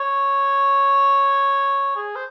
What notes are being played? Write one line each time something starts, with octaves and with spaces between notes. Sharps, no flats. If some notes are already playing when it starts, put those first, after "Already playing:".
Already playing: C#5
G#4
C5